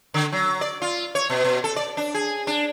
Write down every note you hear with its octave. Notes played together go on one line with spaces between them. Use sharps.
D3
F#3
D5
F4
C#5
B2
B2
A4
D5
D4
G#4
D4